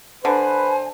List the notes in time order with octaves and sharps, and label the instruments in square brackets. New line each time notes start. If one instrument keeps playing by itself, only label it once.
[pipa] D3 [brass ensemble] B4 [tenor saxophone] C5 [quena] G#5